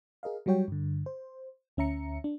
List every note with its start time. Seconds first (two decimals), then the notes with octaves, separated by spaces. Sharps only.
0.23 G#4 A#4 D#5 F5
0.46 F#3 G3 F#4 C#5 G5
0.68 G2 D3
1.06 C5
1.77 D2 C#4 E5 A#5 C#7
2.24 D4